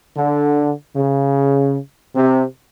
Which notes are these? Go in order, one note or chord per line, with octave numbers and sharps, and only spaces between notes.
D3
C#3
C3